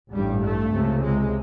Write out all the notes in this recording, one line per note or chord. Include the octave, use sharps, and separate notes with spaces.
A1 G2 G3
A3
C#2 C3
G#3